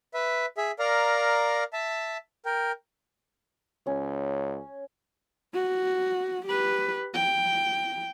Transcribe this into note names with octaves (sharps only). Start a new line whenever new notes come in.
B4 E5
G#4 E5
A#4 D5 F5 A#5
E5 A5
A#4 G5
C#2 C#4
F#4
G4 B4
G5